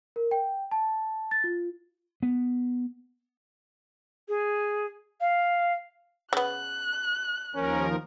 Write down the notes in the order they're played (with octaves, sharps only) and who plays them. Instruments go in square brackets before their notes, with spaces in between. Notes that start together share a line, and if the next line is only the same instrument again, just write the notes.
[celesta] A#4
G5
A5
A6
F4
[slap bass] B3
[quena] G#4
F5
[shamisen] C#3 B3 [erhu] F#6
[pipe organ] D#2 F3 A#4 [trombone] C#4